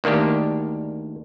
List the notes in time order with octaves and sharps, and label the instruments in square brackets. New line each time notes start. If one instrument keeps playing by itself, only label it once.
[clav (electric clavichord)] D2 D#3 A#3 D4 G4